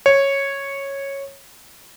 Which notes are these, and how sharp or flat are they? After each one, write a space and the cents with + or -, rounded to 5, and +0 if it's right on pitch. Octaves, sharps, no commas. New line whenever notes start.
C#5 -10